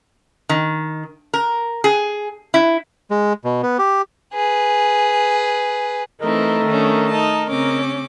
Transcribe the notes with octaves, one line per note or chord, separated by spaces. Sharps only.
D#3
A#4
G#4
E4
G#3
B2
B3
G4
G#4 B4
E3 A3 C4 D#4 A#4 D#5
D#3 C#4 D4
D#4 A5
C#3 C4 C#4 D6